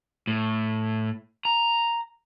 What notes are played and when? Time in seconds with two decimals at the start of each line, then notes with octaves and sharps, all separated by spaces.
0.27 A2
1.45 A#5